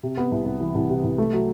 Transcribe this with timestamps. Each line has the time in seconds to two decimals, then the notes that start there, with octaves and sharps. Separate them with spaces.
0.03 C3
0.17 B3
0.32 C2
0.46 C2
0.60 E3
0.75 C2
0.90 C3
1.04 C2
1.18 A3
1.33 F#3